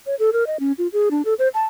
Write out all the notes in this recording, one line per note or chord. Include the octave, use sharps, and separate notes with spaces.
C#5
A4
A#4
D#5
C#4
F4
G#4
D4
A4
C5
A5